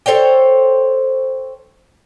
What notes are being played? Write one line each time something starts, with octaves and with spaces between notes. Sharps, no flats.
A4 C5 C#5 G5